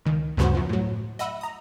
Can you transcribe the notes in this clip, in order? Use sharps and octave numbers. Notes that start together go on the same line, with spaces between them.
C#2 D#3
D2 G2 C#3 B3 F#4 C5
F#2 F3
A2 F#3
D#5 E5 F#5 B5 E6
A#5 D#6